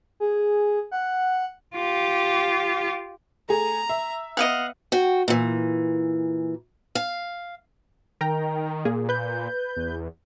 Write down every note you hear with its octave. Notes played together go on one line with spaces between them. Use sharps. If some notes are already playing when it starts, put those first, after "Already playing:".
G#4
F#5
F4 G4
A3 G#4 A#5
E5
B3 D#5 F5 F#5
F#4 G5
A#2 E3
F5
D#3 A#4 G5 A#5
A#2 A#3 G#4
B4 G6
E2